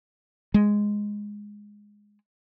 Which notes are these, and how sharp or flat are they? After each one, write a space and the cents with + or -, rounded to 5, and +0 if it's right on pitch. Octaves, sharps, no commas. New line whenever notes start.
G#3 -5